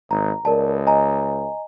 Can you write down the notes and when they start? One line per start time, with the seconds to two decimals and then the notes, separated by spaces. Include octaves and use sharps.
0.11 G#1 A#5
0.45 C#2 A#4 D5 A5
0.87 D#5 G#5 A#5